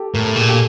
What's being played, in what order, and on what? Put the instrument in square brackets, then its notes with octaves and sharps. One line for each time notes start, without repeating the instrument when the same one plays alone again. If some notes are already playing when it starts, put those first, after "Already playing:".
Already playing: [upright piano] G4 A4
[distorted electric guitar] A2 [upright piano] A#4
[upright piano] A4
[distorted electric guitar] A#2 [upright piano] G#4
[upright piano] G4 A4